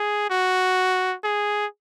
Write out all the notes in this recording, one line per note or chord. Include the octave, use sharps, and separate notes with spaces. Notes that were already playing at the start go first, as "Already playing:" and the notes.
Already playing: G#4
F#4
G#4